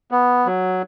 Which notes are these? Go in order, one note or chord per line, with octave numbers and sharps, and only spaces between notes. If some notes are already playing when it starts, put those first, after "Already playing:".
B3
F#3